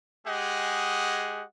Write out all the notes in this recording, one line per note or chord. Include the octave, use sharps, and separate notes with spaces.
G#3 G4 G#4 D#5 F#5